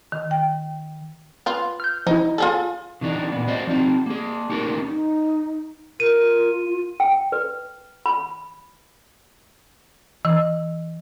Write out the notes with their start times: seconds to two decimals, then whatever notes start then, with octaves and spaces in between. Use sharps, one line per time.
0.12 D#3
0.31 G5
1.46 F4 B4
1.80 F6 G6
2.07 F3 D#4 E4
2.38 F4 G#4 A4
3.01 C#3 E3 D4 D#4
3.32 A#2 B3
3.48 F#4 C5 D5 D#5
3.67 F3 C4 D#4
4.06 A#3 G#4
4.50 A#3 C#4 D#4 F#4 A#4
4.87 D#4
6.00 F4 A#4 D#7
7.00 G5
7.32 B4
8.06 B5
10.25 E3